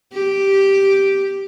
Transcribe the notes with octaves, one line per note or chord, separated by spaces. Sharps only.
G4